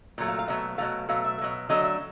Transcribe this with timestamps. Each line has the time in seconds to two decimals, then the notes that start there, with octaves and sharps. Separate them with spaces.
0.18 A#2 F#3 A3
0.28 F5
0.39 F5
0.48 B2 F#3 A3 E5
0.78 B2 F#3 A3 F5
1.09 B2 F#3 A3 F5
1.24 E5
1.38 A3
1.41 B2 F#3
1.69 D3 F#3 A3 D#5
1.84 E5